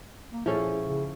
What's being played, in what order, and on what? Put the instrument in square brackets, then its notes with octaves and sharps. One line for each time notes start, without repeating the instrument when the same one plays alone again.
[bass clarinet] A#3
[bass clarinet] A#2 [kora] F3 C#4 A4 [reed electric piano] E4 G#4
[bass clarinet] C#3